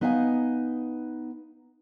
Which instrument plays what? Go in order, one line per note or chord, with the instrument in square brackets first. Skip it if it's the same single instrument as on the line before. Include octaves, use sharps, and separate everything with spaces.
[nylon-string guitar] B3 D#4 B4 F5 F#5 G#5